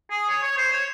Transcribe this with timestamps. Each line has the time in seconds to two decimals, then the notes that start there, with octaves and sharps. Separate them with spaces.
0.11 G#4
0.29 C#5
0.44 C#5
0.58 C5
0.72 C#5